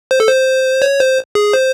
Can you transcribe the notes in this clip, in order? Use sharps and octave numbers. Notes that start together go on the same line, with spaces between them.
C5
A4
C5
C#5
C5
G#4
C5